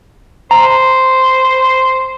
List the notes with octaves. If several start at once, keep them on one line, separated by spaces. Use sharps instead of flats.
C5 A#5